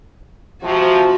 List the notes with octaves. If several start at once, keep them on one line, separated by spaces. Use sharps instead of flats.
C3 F3 F#4